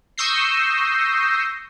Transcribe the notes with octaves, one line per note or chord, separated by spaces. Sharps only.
C#6 D#6 E6 G6 A#6 C7